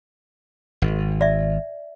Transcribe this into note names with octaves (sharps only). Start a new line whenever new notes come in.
G#1
D5 E5